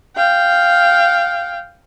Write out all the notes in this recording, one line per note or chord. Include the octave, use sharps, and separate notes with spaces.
F5 G5